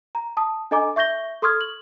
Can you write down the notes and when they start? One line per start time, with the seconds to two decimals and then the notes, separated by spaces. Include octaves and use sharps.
0.15 A#5
0.37 A5 D#6
0.71 D4 A4 D#5 G#5 A#5 D6
0.96 E5 C#6 G6 A#6 G7
1.42 A4 C6 C#6 D#6 F6 G#6
1.61 F#7